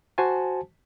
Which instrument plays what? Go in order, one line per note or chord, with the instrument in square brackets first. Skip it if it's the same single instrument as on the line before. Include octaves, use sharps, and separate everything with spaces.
[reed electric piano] F#4 C5 G#5 A5